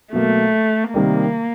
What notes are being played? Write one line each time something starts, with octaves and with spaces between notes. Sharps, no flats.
B2 F#3 A3 A#3
C3 D#3 G3 A#3